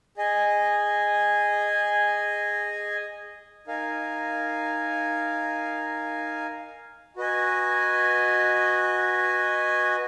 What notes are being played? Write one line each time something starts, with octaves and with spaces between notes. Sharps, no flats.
G#4 D#5 G#5
D#4 A#4 F5 G#5
F#4 B4 D#5 G#5